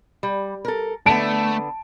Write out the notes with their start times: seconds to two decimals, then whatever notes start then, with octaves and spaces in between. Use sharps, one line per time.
0.23 G3
0.65 A4 A#4
1.06 D3 A3 B3 A5 D7